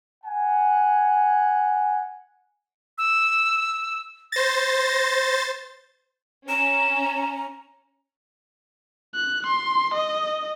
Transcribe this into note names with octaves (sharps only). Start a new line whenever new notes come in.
F#5 G#5
E6
C5 A6 A#6
C#4 A#5 E7
F#6
C6
D#5